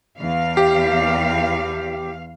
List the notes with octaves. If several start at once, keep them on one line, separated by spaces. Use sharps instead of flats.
E2 F5
G4